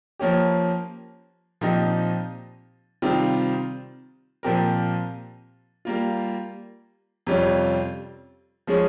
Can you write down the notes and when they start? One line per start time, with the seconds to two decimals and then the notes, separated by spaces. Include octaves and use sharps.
0.19 F3 A#3 C#4 G4
1.61 A#2 F3 C4 D#4 G4
3.02 C3 D#3 G3 C4 F4
4.43 A#2 F3 C4 G4 A#4
5.85 G3 A#3 F4
7.27 F2 C3 G3 C#4 F4
8.67 F3 G#3 C#4 G#4